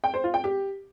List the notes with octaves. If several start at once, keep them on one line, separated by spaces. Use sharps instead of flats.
G5
C5
F4
G5
G4